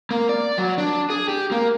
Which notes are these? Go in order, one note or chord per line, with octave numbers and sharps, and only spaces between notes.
A#3
D5
F#3
D4
G#4
G4
A#3